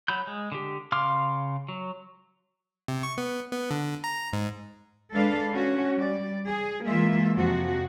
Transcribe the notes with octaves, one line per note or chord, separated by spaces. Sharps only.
F#3 B5 G6
G#3
D3 G4
C#3 F5 C6 D6 F6
F#3
C3
C#6
B3
B3
D3
A#5
G#2
G#3 D4 A4 B4 F5
C#4 F#4
G3 D5
G#4
E3 G#3 A#3 F4 E5
F2 C3 F3 F#4